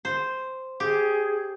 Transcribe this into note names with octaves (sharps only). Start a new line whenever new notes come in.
C5
G4 G#4